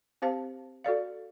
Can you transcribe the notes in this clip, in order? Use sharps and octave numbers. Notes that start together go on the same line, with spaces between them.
C4 G4 C5 F5 A5
F#4 A4 D5 F5